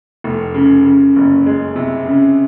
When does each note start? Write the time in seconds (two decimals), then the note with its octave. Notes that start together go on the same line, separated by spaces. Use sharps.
0.24 F1
0.54 C#3
0.85 C#3
1.16 F#1
1.46 G#3
1.76 C3
2.06 C#3